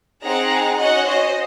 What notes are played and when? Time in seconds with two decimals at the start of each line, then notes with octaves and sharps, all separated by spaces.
0.23 C4 D#4 G#4 F#5 A#5
0.79 C#4 F#4 D#5 F#5
1.08 C5 D#5